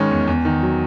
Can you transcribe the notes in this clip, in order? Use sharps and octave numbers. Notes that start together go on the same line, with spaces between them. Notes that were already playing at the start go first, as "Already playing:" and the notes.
Already playing: G#2 D#3 G#3 C#4
E2
E2
D#3
F#3